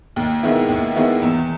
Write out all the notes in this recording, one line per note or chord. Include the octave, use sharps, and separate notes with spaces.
D#2
D#3 G#3 B3 E4
D#2
D#3 G#3 B3 E4
E2